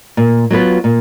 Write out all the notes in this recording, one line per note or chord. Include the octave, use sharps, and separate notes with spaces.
A#2
F#3 B3 F4 B4
A#2